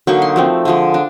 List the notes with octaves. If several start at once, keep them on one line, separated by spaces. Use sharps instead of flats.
D3 F#3 A#3 D#4 C#6
C6
F3 A3 C4
D3 F3 G#3
D4